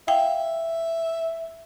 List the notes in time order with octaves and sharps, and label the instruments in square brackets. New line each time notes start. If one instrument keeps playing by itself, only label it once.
[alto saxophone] E5 [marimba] F5 G5